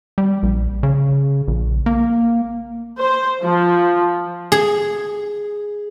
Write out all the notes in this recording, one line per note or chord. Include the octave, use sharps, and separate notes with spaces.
G3
A#1
C#3
A#1
A#3
C5
F3
G#4